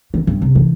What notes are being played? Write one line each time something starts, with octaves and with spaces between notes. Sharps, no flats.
E3
G2
C3
E3